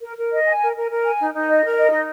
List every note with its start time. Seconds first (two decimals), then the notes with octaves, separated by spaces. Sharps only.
0.03 A#4
0.18 A#4
0.31 D#5
0.47 G#5
0.62 A#4
0.76 A#4
0.90 A#4
1.05 G#5
1.20 D#4
1.34 D#4
1.49 D#5
1.64 A#4
1.77 D#5
1.92 D#4